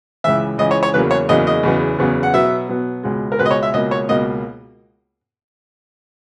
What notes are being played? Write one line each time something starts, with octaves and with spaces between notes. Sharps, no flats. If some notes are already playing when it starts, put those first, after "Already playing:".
C#2 C#3 E3 E5
C#2 C#3 E3 D#5
C#5
C#5
E2 C#3 F#3 A#3 B4
C#5
E2 C#3 F#3 A#3 D#5
D#5
E2 C#3 F#3 B3
E2 C#3 F#3 B3
F#5
B2 F#3 B3 E5
B2 F#3 B3
C#2 B2 G#3
A#4
C#2 B2 G#3 B4
D#5
C#5
E5
C#2 B2 A#3 D#5
C#5
C#2 B2 A#3 D#5